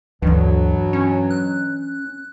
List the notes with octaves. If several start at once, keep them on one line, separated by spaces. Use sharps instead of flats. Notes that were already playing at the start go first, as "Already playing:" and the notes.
D2 G2 B2 E3 F#3 D4
C#4
F#6